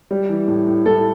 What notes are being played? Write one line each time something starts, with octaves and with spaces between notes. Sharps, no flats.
G3
E3
A2
A2
A2 A4